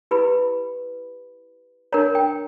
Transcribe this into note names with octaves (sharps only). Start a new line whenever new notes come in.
E4 G4 B4 B5
D4 A#4 C#5 A#5
G5